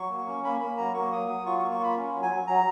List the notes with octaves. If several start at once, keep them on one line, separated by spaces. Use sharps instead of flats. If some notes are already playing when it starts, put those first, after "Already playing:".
Already playing: F#3 C#6
A#3
C#4
A#3 B5
A#3 B5
F#3 A#5
A#3 C#6
F#3 D#6
F#3 D#6
F4 C#6
C#6
A#3
C#6
F4 B5
C#4
F#3
G#5
F#3
F#3 A#5